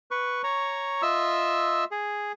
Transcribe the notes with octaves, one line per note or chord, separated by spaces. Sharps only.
B4 C#6
C#5 A#5 C#6
F4 D#5 E5 E6
G#4